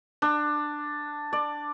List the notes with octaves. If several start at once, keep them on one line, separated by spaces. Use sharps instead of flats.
D4
D5